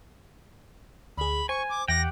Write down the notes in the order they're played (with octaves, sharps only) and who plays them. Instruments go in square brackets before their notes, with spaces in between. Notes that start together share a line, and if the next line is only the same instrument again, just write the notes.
[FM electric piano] D2 G#4 [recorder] B5
[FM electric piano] C5 [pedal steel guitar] G#5 [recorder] C#6
[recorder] D6
[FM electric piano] E2 [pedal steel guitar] G4 F#5 G5 [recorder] A#6